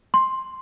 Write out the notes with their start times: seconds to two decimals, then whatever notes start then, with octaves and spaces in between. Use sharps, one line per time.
0.14 C6